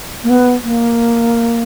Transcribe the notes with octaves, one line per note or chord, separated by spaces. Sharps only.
A#3
B3
A#3